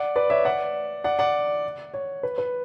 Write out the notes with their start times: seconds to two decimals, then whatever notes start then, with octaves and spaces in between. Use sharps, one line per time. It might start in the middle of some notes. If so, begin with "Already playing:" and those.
Already playing: D5 F#5
0.16 B4 D5
0.30 C#5 E5
0.45 D5 F#5
1.04 D5 F#5
1.19 D5 F#5
1.94 C#5
2.23 B4
2.38 B4